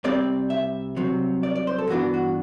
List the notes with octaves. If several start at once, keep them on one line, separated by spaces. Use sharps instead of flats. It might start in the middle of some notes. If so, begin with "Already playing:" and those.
C2 C3 G3 C4 D5
E5
C2 C3 F#3 C4
D5
D5
C5
A4
G2 E3 B3 D4 F#4
F#4